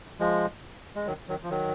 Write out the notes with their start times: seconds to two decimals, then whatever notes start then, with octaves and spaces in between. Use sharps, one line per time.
0.20 F3 G#3
0.96 G#3
1.06 D#3 F#3
1.29 D#3 F#3
1.43 F3
1.50 D#3 F#3